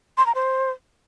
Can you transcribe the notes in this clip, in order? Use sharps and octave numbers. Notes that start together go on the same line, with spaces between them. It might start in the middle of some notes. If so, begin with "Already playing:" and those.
C6
A#5
C5